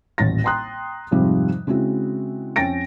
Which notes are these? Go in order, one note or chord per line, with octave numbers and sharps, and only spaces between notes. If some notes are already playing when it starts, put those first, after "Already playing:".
D#1 A1 A2 A6 A#6
G5 A#5 C6 D#6 F#6
F2 G#2 C3 F3 G3
C#3 G#3 C4 E4 F#4
F2 C#4 G5 A6 A#6 D7